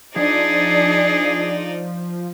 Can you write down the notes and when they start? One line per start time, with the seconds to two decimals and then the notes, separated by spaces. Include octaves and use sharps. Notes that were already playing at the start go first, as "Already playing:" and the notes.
0.16 F3 D4 D#4 G#4 D5